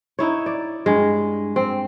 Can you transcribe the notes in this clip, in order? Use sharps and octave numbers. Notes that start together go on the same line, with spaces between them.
D#4 E4 C#5
D5
G2 G#3
C4